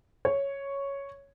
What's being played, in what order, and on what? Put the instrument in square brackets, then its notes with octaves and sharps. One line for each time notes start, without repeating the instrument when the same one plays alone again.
[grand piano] C#5